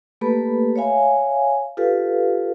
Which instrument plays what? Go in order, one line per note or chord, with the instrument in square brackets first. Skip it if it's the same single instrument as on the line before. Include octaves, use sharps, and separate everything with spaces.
[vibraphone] A3 A#3 G4 A4 B4 B5
C#5 E5 F5 G#5
F4 G4 A4 B4 F5